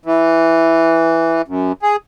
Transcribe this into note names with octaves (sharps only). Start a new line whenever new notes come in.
E3
F#2
G#4